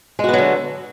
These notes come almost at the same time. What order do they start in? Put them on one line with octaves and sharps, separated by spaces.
G#3 F#4 B3 F#3 D3